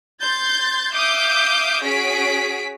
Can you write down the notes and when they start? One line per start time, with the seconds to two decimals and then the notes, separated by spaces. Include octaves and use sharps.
0.23 C6 G6 A6
0.93 E5 F5 D6 D#6 G6
1.83 C#4 F#4 G#4 B6 D7